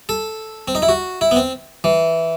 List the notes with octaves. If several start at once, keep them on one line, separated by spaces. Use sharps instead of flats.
A4
C4
D#4
E4
F#4
E4
B3
C4
E3